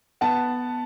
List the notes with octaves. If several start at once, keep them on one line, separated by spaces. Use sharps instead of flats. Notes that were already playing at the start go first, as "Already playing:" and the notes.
B3 F#5 A5